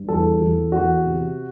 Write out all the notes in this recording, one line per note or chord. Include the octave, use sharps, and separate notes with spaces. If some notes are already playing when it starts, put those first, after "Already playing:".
Already playing: G2
E2 A4
E2
E2 F#4
C3